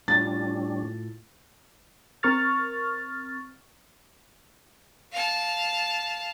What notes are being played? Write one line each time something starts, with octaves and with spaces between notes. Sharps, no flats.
A2 G3 C#4 D4 F4 A6
C4 A#4 C#6 F6 A6
F5 A5